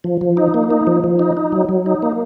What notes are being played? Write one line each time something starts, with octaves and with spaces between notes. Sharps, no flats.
F3
F3
D#4
A#3
D#4
F3
F3
D#4
D#4
F#3
F#3
D#4
A#3